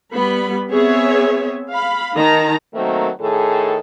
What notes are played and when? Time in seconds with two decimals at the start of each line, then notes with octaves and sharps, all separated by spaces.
0.13 G3 B3 B5
0.69 B3 C4 G#4 C#5 E5
1.70 F5 B5
2.14 D#3 D#4 A5 A#5
2.75 D#3 F#3 A3 A#3 C4
3.21 A2 D#3 G#4 A4